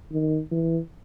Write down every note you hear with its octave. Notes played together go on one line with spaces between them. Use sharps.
D#3
E3